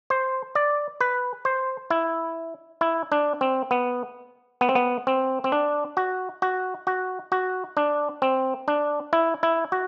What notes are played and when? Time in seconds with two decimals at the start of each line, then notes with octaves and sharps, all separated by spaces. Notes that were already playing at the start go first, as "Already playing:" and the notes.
0.10 C5
0.55 D5
1.01 B4
1.45 C5
1.90 E4
2.81 E4
3.12 D4
3.41 C4
3.71 B3
4.61 B3
4.69 C4
4.75 B3
5.07 C4
5.44 C4
5.52 D4
5.97 F#4
6.42 F#4
6.87 F#4
7.32 F#4
7.77 D4
8.22 C4
8.68 D4
9.13 E4
9.43 E4
9.72 F#4